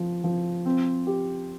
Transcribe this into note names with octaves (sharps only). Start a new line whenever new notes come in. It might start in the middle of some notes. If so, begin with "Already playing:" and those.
Already playing: F3
F3
C4
G4